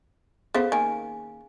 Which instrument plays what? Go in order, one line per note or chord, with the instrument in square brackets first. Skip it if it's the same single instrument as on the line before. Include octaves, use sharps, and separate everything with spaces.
[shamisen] B3 A4 C5 [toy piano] C#4 G#4 F5
[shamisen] D#3 A#3 [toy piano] G#5